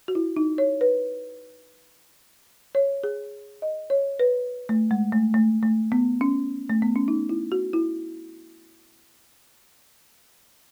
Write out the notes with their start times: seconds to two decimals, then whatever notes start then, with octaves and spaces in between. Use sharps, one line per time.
0.08 F#4
0.15 E4
0.37 D#4
0.58 C#5
0.81 B4
2.75 C#5
3.04 G#4
3.62 D#5
3.90 C#5
4.19 B4
4.69 A3
4.91 G#3
5.12 A3
5.34 A3
5.63 A3
5.92 B3
6.21 C#4
6.70 A3
6.82 B3
6.96 C#4
7.08 D#4
7.29 E4
7.52 F#4
7.73 E4